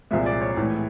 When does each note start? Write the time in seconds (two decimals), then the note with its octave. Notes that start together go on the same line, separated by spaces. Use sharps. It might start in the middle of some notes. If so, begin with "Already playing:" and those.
0.11 C2 A#2 F3 G#3 E5
0.26 D5
0.41 C#5
0.57 A2 E3 G#3